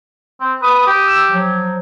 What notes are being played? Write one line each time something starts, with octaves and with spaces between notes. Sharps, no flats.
C4
B4 D#6
G4
E6
F3 F#3